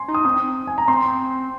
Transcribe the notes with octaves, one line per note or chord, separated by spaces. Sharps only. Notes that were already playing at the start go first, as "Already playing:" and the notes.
Already playing: G#5 C6
D#4
D#6
C4 D#6
G#5
A#5
C4 C6